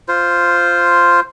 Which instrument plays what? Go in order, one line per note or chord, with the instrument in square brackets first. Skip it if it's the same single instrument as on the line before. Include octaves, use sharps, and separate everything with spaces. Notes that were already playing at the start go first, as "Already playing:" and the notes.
[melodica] F4 C5